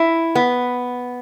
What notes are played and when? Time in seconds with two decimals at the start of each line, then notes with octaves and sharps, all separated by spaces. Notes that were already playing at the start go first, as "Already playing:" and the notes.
Already playing: E4
0.35 B3